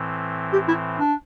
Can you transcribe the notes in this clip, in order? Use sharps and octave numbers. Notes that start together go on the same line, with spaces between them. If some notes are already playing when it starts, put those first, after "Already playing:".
Already playing: A2 E3 C4
G4
E4
D4